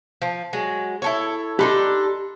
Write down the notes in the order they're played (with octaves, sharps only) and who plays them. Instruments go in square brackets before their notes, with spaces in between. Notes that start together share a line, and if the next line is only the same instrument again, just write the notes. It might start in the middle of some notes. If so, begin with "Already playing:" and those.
[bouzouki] F3
F#3 G#3
E4 A4 C#5
[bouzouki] D4 D#4 A4 [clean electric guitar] G4 B5 C6